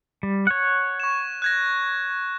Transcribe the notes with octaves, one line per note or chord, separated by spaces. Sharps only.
G3
C#5 F#5
C#6 E7
F#6 G#6 A#6